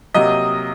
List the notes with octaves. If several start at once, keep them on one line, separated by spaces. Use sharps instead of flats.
C3 F#3 A#3 D#5 D#6